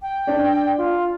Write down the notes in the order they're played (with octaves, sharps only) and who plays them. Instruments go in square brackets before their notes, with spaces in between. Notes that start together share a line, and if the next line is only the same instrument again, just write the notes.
[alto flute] G5
[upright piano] D4
[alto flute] F4